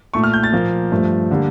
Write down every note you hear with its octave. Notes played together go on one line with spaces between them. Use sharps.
A#2 A3 C#6
F6
G6
A6
A#2 F3 A#3
G2 F3 A3
D3 G3 A#3